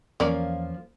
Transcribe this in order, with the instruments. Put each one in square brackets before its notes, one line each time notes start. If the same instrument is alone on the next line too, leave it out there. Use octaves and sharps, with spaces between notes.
[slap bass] E2 E3 [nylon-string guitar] F3 A#3 [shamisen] C#4 A#4 D5